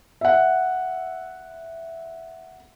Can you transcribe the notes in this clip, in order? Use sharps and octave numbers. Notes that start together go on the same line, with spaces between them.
E5 F#5